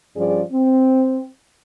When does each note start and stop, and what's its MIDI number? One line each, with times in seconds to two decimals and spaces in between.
0.16 0.41 43
0.16 0.41 53
0.16 0.41 55
0.16 0.41 61
0.16 0.41 68
0.16 0.41 74
0.52 1.28 60